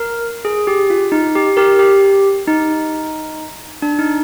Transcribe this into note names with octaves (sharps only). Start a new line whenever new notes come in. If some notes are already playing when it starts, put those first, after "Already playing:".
Already playing: A#4
G#4
G4
F4
D#4
G4
G4 A#4
G4
D#4
D4
D#4